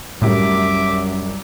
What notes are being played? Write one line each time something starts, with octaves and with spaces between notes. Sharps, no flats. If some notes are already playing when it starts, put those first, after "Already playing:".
C2 F#2 A2 G3 E5 D6